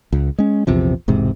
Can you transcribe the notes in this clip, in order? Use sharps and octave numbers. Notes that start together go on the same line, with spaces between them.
C#2
G#3 C#4
A#1 E2 C3 F3
E1 G#2 C3